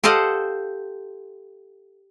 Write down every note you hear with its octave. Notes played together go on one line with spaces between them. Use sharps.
G4 A4 C5 D#5 F5 F#5